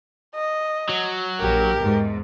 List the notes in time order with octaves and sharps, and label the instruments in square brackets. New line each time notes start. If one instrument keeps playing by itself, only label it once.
[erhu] D#5
[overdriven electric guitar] F#3
[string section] A#1 [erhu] G4 [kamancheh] A#4
[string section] E2 G#2